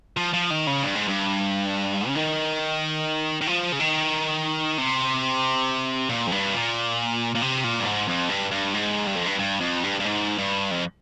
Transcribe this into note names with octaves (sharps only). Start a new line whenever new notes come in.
F3
F3
D#3
C#3
G2
G#2
G2
C#3
D#3
D#3
F3
C#3
D#3
C3
A#2
F2
G2
A#2
A#2
C3
A#2
G2
G#2
F2
G2
G2
G#2
G2
F2
G2
G2
F2
G2
G2
G#2
G2
F2